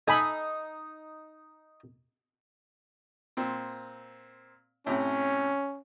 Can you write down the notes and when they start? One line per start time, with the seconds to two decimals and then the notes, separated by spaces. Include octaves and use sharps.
0.08 D#4 A4 G#5 B5
3.37 A#2 C4
4.87 A2 C3 C#4